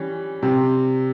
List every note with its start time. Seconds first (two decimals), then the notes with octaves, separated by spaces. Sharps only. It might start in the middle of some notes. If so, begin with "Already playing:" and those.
Already playing: E3 G3 C#4
0.43 C3 G3 C4